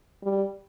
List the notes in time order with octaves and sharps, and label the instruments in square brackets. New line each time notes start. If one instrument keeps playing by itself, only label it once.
[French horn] G3